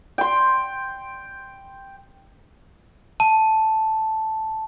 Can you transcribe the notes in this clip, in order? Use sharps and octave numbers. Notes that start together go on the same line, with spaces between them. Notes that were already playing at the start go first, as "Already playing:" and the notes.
G5 C6
A5